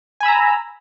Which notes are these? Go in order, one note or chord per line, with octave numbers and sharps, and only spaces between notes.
G#5 A#5 B5 E6